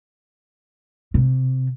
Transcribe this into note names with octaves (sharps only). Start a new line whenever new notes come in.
C3